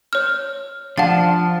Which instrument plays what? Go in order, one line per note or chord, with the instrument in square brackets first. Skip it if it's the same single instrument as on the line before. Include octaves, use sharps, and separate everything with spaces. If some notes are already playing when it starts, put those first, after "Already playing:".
[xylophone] C#5 F6
[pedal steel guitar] F3 [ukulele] D4 F5 A5 [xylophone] F#5 A6